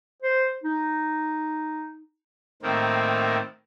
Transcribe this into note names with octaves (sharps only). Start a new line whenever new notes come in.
C5
D#4
A2 D#3 A#3 C4